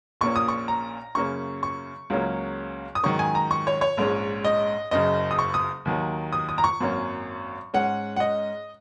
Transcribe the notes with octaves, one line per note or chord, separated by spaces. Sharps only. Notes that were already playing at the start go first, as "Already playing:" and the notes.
A#1 A#2 A#3 C#4 C#6
D#6
C#6
A#5
F#2 C#3 A#3 C#4 C#6
C#6
C#2 C#3 F#3 A#3 C#4
D#6
G#2 D#3 F#3 C#4 C#6
G#5
A#5
C#6
C#5
C#5
A#1 G#2 G#3 C#4
D#5
F#1 F#2 C#3 D#5
D#6
C#6
D#6
D#2 D#3 F#3
D#6
D#6
A#5
C#6
G#1 F#2 F#3 A#3 C#4
G#2 G#3 C#4 F#5
F#5
D#5